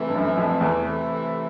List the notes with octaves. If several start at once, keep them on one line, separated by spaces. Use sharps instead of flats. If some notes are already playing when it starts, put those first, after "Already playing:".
Already playing: C3 E3 A3
G2
F#2
F2
E2